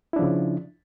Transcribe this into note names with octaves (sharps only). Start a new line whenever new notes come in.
C#3 F3 D4 E4